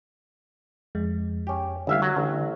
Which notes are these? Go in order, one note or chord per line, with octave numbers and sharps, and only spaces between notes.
F2 G#3
C#4 G4
A1 D3 G3 E5 F5
F#3
A1 D3